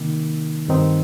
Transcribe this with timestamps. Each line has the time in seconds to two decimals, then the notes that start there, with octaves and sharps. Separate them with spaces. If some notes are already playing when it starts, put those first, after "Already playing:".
Already playing: C3 D#3 A#3 D#4
0.68 G2 D#3 C4 D#4